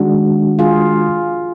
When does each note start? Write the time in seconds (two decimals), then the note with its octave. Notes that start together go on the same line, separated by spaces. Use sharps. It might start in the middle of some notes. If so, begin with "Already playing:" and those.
Already playing: D#3 G#3 D4 F#4
0.59 F4 G#4